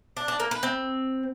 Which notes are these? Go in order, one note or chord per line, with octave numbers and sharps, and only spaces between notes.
D4
D4
A#3
B4
C4